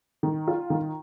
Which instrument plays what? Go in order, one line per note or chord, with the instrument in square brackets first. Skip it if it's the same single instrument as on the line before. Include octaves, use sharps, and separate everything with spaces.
[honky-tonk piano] D#3
F4
D#3